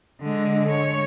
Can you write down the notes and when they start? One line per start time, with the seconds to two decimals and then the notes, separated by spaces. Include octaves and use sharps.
0.22 D3 G#3
0.71 C#5